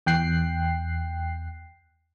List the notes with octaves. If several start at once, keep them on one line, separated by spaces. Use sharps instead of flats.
E2 G5 F#6 C7